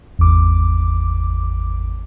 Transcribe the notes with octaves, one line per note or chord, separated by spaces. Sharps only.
G#1 E2 D6